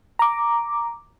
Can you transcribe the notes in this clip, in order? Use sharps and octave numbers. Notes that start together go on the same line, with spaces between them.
A#5 D6